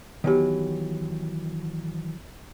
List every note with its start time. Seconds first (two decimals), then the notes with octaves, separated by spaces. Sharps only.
0.24 D#3 E3 F#3 B3 G4